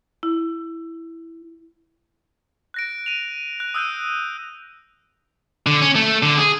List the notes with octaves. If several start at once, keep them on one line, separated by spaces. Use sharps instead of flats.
E4
F#6 A#6 D7
D#7 F7
F#6
D#6 E6 F#6 G6 D#7
D3
C#4
A3
D3
G#4